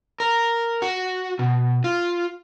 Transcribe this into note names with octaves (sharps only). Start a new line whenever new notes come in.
A#4
F#4
B2
F4